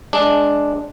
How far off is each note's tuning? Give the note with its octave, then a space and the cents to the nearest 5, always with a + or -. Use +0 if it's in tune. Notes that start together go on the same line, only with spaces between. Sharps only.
G#3 +10 D4 +0